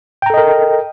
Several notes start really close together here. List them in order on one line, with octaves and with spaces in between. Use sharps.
G5 A#5 A4 D#5 A#4